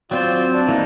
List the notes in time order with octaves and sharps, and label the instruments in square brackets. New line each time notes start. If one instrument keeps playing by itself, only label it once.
[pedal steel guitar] F#3 C4 C5 [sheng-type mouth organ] F4 D5 G5
[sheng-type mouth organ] D4 D5
[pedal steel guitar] E3 A#3 D#4